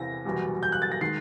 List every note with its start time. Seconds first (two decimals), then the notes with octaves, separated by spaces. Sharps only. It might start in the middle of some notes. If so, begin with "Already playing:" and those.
Already playing: E2 C3 E3 A#6
0.25 F#1 E2 B2 G3
0.63 G6
0.72 F#6
0.82 A6
0.92 A#6
1.01 D#3 G#3 C7